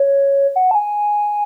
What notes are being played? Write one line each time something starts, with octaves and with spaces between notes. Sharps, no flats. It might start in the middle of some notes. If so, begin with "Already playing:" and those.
Already playing: C#5
F#5
A5
G#5